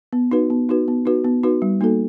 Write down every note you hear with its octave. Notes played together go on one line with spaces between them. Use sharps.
B3
D#4 F#4 B4
B3
D#4 F#4 B4
B3
D#4 F#4 B4
B3
D#4 F#4 B4
G3
A#3 D#4 F#4 A4